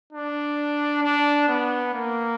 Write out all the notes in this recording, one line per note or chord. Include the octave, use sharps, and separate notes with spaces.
D4
D4
B3
A#3